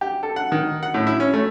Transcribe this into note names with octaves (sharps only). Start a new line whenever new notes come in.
G4
A4
F#5
D#3
F#5
A2
E4
C#4
A3